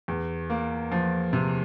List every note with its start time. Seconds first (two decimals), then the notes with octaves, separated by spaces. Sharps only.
0.08 E2
0.50 A#3
0.92 F3
1.33 C3